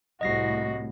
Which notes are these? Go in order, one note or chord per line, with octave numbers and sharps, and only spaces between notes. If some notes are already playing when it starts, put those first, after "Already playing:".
C2 A2 F#4 D#5 A#6 C7